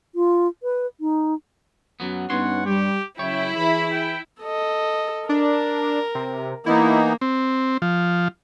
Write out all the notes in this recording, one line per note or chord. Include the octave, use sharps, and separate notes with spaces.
F4
B4
D#4
F#2 F#3 B3
G2 B3 C#4 D#4 C#5 F#5 C6
G3 G4
C#3 F#3 C#4 E4 C#5 G5
E3 G#4 B5
G5
A4 D#5
D4 A#4
C3
E3 A#3 B3 D#4 E4
C4
F3